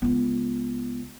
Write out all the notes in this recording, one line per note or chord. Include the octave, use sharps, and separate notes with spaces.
C#2 B3